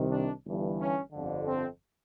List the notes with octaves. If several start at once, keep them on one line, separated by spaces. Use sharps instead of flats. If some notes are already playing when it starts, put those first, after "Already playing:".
Already playing: C2 C3 D#3
D4
G1 G2 E3
C#4
G1 F2 D3
C4